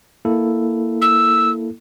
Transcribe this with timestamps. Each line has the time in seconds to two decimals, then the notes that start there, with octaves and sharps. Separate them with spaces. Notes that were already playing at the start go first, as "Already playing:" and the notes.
0.25 A#3 E4 A4
1.01 E6